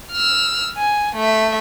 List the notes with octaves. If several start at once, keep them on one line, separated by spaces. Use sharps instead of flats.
E6 F6
G#5
A3 E5